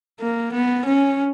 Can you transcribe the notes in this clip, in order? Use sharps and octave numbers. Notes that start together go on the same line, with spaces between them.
A#3
B3
C#4